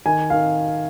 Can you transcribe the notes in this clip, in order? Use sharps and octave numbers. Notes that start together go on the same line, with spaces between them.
D#3 G#5
D#3 F5